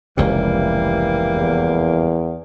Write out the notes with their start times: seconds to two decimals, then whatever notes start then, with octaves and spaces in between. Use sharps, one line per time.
0.17 F1 C#2 C3 E3 G3 A#3
1.34 E2